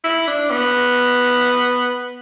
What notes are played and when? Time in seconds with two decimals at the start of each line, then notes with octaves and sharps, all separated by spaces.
0.04 E4
0.27 D4
0.50 B3